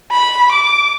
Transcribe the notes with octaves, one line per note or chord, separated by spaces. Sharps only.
B5
D6